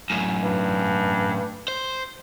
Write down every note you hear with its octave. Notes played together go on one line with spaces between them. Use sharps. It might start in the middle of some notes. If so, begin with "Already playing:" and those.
F#2 A2
G2
C5